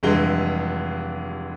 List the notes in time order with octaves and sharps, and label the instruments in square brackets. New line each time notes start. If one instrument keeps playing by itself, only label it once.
[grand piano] F1 G2 E3 G#3 G7